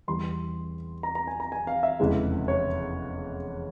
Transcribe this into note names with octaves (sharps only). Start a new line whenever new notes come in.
E2 E3 G3 C6
A#5
A#5
G#5
A#5
G#5
F5
E5
F1 E2 C#3 E3 G#3
C#5